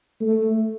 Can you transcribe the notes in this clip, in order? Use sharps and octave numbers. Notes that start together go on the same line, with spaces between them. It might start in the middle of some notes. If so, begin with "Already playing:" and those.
A3